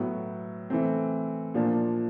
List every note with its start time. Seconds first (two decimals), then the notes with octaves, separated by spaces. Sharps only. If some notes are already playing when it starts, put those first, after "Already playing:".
Already playing: A2 F#3 B3
0.70 E3 A3 C4
1.54 A#2 F3 A#3 D4